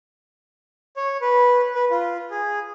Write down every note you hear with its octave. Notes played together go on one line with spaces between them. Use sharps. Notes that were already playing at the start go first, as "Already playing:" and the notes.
C#5
B4
B4
F4
G#4